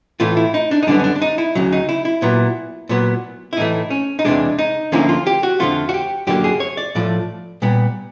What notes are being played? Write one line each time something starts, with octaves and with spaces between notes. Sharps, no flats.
A2 E3 A3 F4
E4
D#4
D4
D#4
F#2 D3 G3 B3 D4
C#4
D4
D4
D#4
E4
D2 C#3 F#3
D#4
E4
E4
A#2 F#3 B3
A#2 F#3 B3
E4
A2 E3 A3 D#4
C#4
D#4
E2 C3 E3 G#3 D4
D#4
D2 D3 F3 A#3 C#4 E4
F4
G4
F#4
F2 D3 F3 A3 F4
F#4
G4
F#2 D3 F#3 A#3 G4
G#4
C#5
D5
A2 F3 A3 D5
A#2 G3 B3